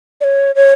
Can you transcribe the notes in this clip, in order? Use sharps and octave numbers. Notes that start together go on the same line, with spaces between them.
D5
C#5
C#5